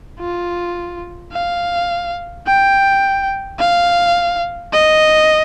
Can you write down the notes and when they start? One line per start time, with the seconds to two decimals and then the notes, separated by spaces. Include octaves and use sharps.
0.20 F4
1.33 F5
2.47 G5
3.60 F5
4.73 D#5